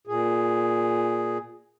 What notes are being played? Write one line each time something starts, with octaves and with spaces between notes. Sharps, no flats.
A#2 G#4